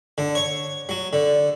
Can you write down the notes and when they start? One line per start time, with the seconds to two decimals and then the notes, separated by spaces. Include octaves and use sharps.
0.18 D3
0.35 C#5
0.89 F#3
1.13 D3